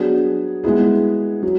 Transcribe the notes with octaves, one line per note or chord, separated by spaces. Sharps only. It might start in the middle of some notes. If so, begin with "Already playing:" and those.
Already playing: F#3 B3 D4 G#4
G#3 B3 E4 G#4
F#3